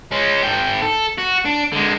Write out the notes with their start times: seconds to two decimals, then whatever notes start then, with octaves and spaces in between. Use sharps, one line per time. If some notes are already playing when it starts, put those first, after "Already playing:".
0.11 G#3 C#4
0.43 G#2 G5
0.82 A4
1.18 F#4
1.45 D4
1.72 D3 G#3